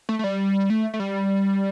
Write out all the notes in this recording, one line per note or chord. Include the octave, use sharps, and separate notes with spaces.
A3
A3
G3
A3
A3
G3